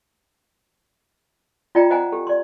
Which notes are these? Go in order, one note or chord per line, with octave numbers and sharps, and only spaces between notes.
F4 D5 D#5 G5 A#5
C5 D#5 F#5 G#5 A#5
G4 A4
D5 C6